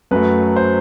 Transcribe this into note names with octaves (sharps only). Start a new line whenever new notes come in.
F#2 F#3 A3 B4
C5